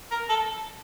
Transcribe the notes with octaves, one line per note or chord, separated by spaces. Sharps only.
A#4
A4